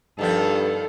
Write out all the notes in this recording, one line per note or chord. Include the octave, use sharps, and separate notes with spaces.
G2 D#3 F3 B3 A4